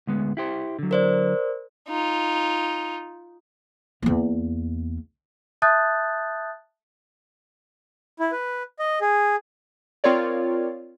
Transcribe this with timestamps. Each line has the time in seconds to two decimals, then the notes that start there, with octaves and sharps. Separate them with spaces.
0.07 D2 G#3 B3
0.37 E4 G4 C5
0.79 D3 F#3
0.91 A#4 C5 D5
1.89 D#4 F4
4.02 E2 A#3
5.62 E5 A5 D#6 F#6 G6 A6
8.19 E4
8.32 B4
8.79 D#5
9.01 G#4
10.04 C4 F4 A#4 C#5 D5